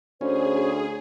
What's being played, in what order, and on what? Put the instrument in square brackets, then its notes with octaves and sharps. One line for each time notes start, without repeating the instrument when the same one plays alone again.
[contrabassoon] D2 [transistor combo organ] C#4 [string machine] G#4 [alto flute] C5